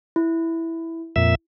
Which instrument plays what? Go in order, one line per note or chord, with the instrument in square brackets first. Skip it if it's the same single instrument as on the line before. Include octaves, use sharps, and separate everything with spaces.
[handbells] E4
[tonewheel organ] F2 A#2 E5